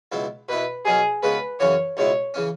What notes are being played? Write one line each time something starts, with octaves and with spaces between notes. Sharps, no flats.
C#2 B2 F#3 E4
B2 B3 E4 B4
B2 F#3 C#4 G#4
C#3 G#3 B3 F#4 B4
F#2 C#3 E3 C#4 F#4 C#5
C#2 B2 G#3 E4 C#5
C#3 E3 C#4